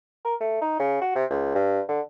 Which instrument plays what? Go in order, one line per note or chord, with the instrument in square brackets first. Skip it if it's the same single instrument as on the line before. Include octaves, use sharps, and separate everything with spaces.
[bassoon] A#4
A3
D#4
C#3
F#4
C3
C#2
G2
D3